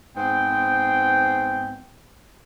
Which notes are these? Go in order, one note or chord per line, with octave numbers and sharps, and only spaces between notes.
G#2 B3 C4 C5 G5